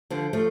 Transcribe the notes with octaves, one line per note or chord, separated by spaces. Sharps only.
D3 F3
F3 A3